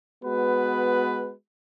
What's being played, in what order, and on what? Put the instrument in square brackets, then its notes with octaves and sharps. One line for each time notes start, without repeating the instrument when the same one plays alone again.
[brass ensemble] G#3 B3 F#4 B4